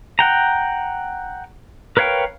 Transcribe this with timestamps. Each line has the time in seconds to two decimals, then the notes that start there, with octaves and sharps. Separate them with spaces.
0.19 F#5 G5 A#5
1.97 A#4 B4 C#5 F5 G5